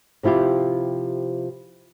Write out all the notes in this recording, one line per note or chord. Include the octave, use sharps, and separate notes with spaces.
C3 F3 E4 F4 G4